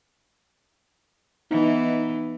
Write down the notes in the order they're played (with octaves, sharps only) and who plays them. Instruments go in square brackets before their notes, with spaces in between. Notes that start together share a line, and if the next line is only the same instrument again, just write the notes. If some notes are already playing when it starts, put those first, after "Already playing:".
[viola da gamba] E3 B3 [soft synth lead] D#4